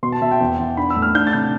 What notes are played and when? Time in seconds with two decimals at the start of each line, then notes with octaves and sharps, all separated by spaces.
0.03 B2 C6
0.12 A5
0.22 B2 E5
0.31 G5
0.41 E2
0.58 E2
0.77 D4 B5
0.90 E6
0.96 A2
1.02 F6
1.15 D4 G6
1.27 A6
1.33 C3 G6